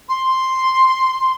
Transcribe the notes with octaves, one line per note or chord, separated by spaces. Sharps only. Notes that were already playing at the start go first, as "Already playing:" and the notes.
C6